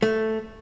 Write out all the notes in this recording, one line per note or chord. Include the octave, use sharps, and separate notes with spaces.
A3